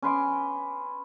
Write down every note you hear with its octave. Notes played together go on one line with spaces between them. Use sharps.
C#4 B4 C6 D6